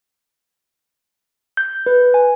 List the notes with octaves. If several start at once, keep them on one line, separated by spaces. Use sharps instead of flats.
G6
B4
G#5